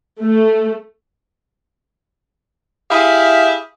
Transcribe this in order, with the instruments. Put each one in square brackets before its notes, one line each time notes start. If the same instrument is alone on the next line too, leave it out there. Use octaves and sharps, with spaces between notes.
[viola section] A3
[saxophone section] E4 G4 G#4 E5 F5